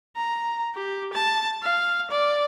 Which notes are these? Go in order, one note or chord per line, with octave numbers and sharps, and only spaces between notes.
A#5
G4
A5
F5
D5